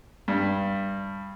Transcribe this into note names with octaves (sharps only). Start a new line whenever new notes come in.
G2